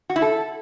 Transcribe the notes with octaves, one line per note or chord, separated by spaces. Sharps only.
F#4
E4
A4